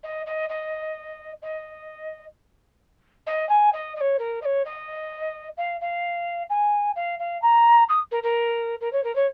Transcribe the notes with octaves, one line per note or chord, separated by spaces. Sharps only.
D#5
D#5
D#5
D#5
D#5
G#5
D#5
D#5
C#5
A#4
D#5
C#5
D#5
F5
F5
G#5
F5
F5
A#5
D#6
A#4
A#4
A#4
C#5
A#4
C#5